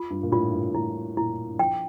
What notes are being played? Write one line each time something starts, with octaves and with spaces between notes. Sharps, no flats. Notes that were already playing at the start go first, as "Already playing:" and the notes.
Already playing: F4
G2
A#2
A2 F4
G2
A2 E4
A#2 E4
F3 G5